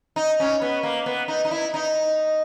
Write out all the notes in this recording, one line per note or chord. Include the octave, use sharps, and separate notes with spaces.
D#4
C#4
B3
A#3
B3
D#4
D#4
E4
D#4